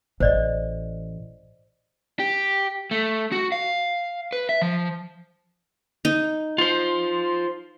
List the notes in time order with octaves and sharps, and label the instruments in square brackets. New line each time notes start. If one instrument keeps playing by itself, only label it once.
[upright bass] A1 [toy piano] C5 D5 D#5
[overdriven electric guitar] G4
A3
F#4
F5
B4
E5
F3
[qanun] D#4
[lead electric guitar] F4 C5